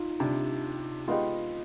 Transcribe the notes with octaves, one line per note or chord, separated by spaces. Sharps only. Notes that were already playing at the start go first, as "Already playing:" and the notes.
Already playing: D#4 F4
C3 G3 D4
G#3 B3 D#4 F4 G4